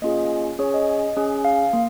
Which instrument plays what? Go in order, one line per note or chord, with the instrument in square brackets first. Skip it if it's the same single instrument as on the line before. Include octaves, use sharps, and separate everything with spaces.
[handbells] A#3 C#4 F4 G#4 D#5
C#4 G#4 C#5
D#5
C#4 G#4
F5
A#3